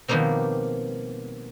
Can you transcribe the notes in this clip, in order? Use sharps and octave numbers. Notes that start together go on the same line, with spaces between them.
B2 D#3 F3 G3 A#3 C4